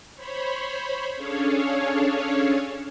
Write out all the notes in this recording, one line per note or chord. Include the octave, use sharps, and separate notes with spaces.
C5 C#5 B5
C#4 D4 G#4 A4 C#5 F5